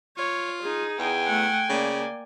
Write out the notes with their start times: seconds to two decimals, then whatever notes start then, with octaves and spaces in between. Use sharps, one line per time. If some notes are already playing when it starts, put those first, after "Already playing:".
0.18 F4 C#5
0.62 D#4 G#4
0.99 E2 G5 G#5
1.27 A3 F#5
1.69 C#3 A#3 D5